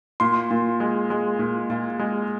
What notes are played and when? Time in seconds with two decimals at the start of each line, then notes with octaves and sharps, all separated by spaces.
0.20 A#2 C6
0.51 A#2
0.80 G#3
1.10 G#3
1.39 A#2
1.70 A#2
1.99 G#3